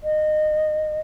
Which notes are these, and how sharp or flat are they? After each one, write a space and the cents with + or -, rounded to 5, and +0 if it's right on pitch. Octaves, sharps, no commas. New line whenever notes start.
D#5 -20